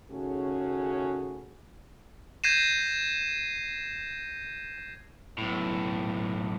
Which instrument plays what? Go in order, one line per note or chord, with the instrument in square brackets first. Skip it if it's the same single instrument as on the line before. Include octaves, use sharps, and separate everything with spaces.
[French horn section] D#2 C#3 A3 C#4 F#4 G#4
[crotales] G6 G#6 A#6 C7 D#7 E7
[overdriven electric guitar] B1 A2